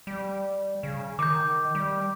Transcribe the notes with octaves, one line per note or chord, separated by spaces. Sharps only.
G3
C#3
D#3 D6 G6
G3